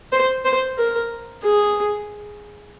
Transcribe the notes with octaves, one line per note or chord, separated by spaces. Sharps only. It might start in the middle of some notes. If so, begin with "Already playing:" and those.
C5
C5
A#4
G#4